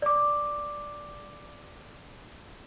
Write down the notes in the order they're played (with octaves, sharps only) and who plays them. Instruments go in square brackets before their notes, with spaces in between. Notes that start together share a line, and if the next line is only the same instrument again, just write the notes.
[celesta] D5 D6